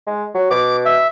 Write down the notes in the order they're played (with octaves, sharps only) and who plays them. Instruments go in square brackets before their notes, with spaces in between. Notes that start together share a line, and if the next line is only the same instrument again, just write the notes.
[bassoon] G#3
F#3
[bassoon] B2 [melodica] D6
[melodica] E5